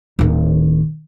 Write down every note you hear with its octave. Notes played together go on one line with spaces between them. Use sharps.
D1 D#3